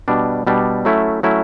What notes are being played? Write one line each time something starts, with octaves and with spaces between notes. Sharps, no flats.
B2 G3 D4
B2 G3 D4
F#3 A3 C#4 E4
F#3 A3 C#4 E4